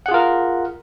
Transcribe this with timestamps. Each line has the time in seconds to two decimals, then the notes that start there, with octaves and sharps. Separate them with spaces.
0.06 F#5
0.09 G#4
0.11 F4
0.14 A#4